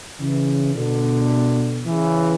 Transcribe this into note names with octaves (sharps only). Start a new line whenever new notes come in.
C#3 E3
B2 D3
C#3 E3